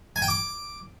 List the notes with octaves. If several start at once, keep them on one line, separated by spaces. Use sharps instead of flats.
G#5
G5
D6